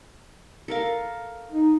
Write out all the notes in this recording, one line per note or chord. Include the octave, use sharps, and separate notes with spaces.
A4 A#4 F5
D#4